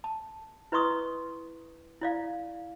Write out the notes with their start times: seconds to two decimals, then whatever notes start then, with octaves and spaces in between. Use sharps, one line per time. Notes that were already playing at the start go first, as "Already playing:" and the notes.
0.04 A5
0.72 E4 B4 D#5 C6 C#6 D#6
2.01 E4 D5 F5